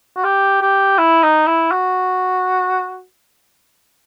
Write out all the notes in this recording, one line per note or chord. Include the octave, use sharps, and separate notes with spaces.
F#4
G4
G4
E4
D#4
E4
F#4